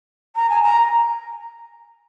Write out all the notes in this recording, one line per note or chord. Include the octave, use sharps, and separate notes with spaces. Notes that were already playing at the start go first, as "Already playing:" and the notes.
A#5
G#5
A#5